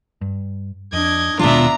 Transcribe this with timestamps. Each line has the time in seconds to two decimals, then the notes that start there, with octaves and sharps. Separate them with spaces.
0.21 G2
0.93 F2 D4 D#5 G#6
1.39 D#1 B2 D#3 G#3 D4 F4 E5 A#5